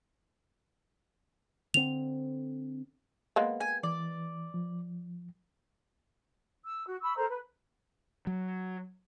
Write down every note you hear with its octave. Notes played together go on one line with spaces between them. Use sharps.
D3 C4 F7
G#3 A#3 B3
G#5
E3 D5
F3
E6
F#4
B5 C#6 E6
A4 A#4 C5 A#5
B4
F#3